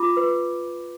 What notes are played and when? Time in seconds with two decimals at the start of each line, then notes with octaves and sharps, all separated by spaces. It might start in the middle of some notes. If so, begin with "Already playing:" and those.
Already playing: F4 B5 D6
0.17 B4